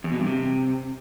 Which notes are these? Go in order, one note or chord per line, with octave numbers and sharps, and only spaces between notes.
E2
B2
G2
C3